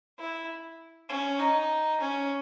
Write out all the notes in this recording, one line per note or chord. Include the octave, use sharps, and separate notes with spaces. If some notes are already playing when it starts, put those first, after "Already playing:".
E4
C#4
D#4
C#4